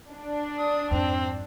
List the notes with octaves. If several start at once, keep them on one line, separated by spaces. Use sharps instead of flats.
D4
D#6
F2 G#2 C4